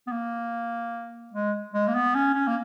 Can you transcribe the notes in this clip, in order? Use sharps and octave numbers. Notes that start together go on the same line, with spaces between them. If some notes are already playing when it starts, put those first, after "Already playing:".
B3
A#3
G#3
G#3
A#3
B3
C#4
C#4
A#3